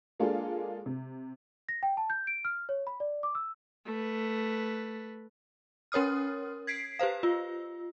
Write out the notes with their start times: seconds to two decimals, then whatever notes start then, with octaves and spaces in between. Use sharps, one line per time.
0.20 G#3 A#3 D4 F4 G#4 A4
0.86 C3
1.69 A#6
1.83 G5
1.97 A5
2.10 G6
2.27 D7
2.45 F6
2.69 C#5
2.87 B5
3.00 D5
3.23 D6
3.35 E6
3.86 A3 B4
5.92 C#4 A#4 C#5 D#6 F6
6.67 G#6 B6 C7 D7
6.99 G4 B4 C5 F5
7.23 F4